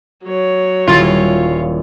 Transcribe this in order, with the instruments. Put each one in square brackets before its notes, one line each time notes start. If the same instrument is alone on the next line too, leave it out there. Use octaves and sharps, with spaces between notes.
[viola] F#3 C#5
[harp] D#1 E4 G#4 [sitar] F4